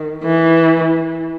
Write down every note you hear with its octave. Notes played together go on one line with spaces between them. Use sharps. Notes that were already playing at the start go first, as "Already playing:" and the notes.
Already playing: D#3
E3